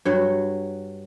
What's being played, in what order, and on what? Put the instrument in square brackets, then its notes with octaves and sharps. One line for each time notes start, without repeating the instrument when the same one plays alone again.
[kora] G2 F#3 F#5